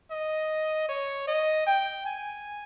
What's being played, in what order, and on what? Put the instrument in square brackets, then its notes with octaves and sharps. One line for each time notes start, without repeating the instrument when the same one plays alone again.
[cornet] D#5
C#5
D#5
G5
G#5